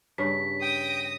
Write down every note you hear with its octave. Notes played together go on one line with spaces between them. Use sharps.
G2 C#3 B6
G5 D#6 A#6